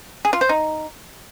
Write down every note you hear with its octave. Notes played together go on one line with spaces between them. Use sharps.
G#4
F4
C5
D#4